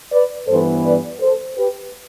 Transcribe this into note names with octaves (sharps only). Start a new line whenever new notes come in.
B4 D5
G2 E3 B3 A4 C5
B4 D5
A4 C5
G4 B4